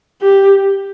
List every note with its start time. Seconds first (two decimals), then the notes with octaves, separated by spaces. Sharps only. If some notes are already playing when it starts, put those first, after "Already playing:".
0.22 G4